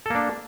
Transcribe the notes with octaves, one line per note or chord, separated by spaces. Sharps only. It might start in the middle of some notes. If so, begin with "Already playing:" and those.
A#3 D4 A4